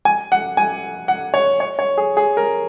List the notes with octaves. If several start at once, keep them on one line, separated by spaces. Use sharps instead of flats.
G#5
F#5
G#5
F#5
C#5
C#5
C#5
G#4
G#4
A#4